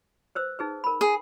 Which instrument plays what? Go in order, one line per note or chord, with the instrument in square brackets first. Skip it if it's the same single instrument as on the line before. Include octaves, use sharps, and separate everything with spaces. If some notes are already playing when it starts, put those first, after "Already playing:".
[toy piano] B4 C5 E6
D#4 G#4 B4
A#4 B5
[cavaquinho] G#4